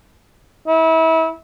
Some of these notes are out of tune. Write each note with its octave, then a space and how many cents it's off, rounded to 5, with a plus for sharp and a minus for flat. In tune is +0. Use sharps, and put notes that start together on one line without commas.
E4 -30